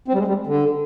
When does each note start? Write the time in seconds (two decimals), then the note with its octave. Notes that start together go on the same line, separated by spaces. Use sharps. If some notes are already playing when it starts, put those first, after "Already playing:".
0.08 C4
0.14 G3
0.18 G#3
0.27 G3
0.47 D3